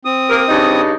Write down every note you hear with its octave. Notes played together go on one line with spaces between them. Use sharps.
C4 D#6
A#3 G4 A#4
G2 C#3 D#4